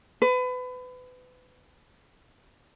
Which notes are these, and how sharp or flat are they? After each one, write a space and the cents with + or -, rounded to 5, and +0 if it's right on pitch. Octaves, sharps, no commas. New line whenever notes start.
B4 +30